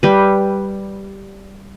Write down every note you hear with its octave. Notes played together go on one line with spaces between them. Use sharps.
G3 B4